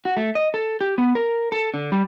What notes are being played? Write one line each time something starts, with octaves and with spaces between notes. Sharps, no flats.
F#4
A3
D#5
A4
G4
B3
A#4
A4
D3
G3